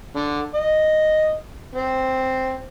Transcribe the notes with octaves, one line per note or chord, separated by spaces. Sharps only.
D3
D#5
C4